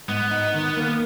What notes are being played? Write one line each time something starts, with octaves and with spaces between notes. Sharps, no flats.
G#2 B3
D#4
D#3
A#3